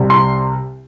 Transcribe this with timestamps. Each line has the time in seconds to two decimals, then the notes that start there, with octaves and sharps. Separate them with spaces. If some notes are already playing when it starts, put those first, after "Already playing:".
Already playing: C2 C3 G3
0.10 C6